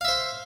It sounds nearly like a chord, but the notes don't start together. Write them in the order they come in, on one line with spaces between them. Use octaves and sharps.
F5 E5 C5